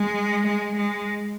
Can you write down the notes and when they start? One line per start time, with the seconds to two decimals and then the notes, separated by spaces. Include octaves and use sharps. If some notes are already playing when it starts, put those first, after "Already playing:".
Already playing: G#3
0.47 G#3
0.76 G#3